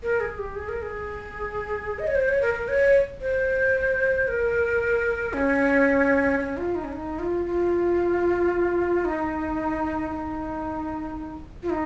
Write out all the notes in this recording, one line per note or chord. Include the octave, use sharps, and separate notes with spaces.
A#4
G#4
G4
G#4
A#4
G#4
D#5
C#5
C5
C#5
A#4
A#4
C#5
C5
A#4
C#4
C#4
F4
D#4
C#4
D#4
F4
F4
D#4
D#4
F4
D#4